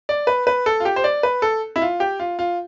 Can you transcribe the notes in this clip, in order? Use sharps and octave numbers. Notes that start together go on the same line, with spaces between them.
D5
B4
B4
A4
F4
G4
C5
D5
B4
A4
E4
F4
G4
F4
F4